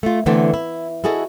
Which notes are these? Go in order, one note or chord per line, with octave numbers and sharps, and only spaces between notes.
A3 F4
D3 E3 A3 B3 C4
E4
E4 F#4 G#4 A4 D#5